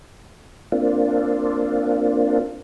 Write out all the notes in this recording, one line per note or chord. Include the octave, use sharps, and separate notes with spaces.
A#3 C4 D4 F4